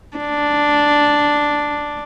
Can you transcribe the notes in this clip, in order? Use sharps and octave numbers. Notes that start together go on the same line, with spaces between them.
D4